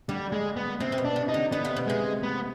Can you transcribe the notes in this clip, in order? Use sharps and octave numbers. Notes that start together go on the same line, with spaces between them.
D3 G3
G#3
B3
C3 C4
C3
B2
D4
C3
D#4
D3
D3 B3
C3
B2
C3 G#3
B3